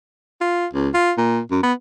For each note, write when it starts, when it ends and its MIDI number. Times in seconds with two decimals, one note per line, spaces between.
0.41 0.66 65
0.73 0.89 37
0.94 1.12 65
1.17 1.40 46
1.51 1.63 42
1.63 1.73 59